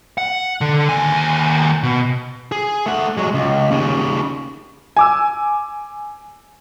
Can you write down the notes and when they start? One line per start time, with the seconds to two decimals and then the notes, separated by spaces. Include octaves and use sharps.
0.18 F#5
0.61 D3
0.89 D#2 G#5
1.83 B2
2.52 G#4
2.86 A3 F#5
3.17 F#3 G#3
3.34 C#2
3.71 D#2 C#3
4.97 G#5 D6 E6